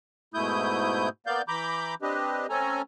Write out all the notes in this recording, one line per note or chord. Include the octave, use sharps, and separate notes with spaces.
G#2 B2 A3 E4 D#6 G6
A#3 B3 D5 F5 G6
E3 A#5 B5 D6 G6
C4 D4 G4 B4 D#5
A3 C4 C#4 A4 G#5 A#5